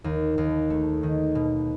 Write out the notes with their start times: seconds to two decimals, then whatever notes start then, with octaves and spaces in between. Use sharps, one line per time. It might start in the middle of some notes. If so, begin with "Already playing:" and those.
0.04 D#2
0.38 D#2
0.70 A3
1.03 D#3
1.35 B2